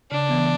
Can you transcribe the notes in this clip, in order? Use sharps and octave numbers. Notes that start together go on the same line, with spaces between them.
C#3 D4
E3 B3